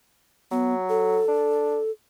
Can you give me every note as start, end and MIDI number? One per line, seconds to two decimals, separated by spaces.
0.51 1.21 54
0.51 0.74 59
0.89 1.91 69
1.28 1.78 62